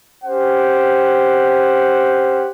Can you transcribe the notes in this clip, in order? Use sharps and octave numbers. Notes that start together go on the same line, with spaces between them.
C#4 G4 C5 F#5